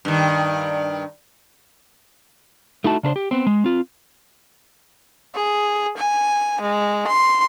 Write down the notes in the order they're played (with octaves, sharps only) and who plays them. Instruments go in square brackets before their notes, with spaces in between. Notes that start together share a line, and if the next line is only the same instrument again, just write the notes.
[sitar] G2 D#3
[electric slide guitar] A3 D#4 E4 F#4 A5
C#3 D4 B4 C5
G4
B3 C4
G#3
C4 F4
[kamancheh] G#4
G#5
G#3
C6